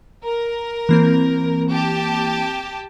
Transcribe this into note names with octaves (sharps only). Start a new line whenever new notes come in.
A#4
E3 A#3 C4
G4 A5